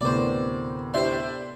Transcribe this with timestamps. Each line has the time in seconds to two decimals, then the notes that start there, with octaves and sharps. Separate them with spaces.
0.01 D2 A2 C3 B3 A#4 C5 D5
0.94 D4 E4 G4 C5 C6